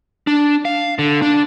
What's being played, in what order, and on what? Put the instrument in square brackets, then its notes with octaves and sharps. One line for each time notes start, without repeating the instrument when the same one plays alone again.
[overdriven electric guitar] D4
F5
D3
D4